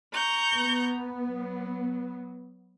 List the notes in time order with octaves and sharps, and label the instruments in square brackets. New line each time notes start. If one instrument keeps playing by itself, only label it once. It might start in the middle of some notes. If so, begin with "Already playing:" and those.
[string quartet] A#5 C#6 G6
[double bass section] B3
[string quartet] F#3